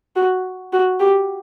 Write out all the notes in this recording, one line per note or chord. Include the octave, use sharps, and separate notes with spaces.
F#4
F#4
G4